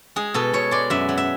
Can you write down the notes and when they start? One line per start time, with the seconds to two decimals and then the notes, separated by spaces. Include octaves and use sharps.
0.16 G#3 G#4
0.34 B2 A4
0.53 B2 C#5
0.71 G#3 D5
0.90 F#2 E5
1.09 F#3
1.17 E5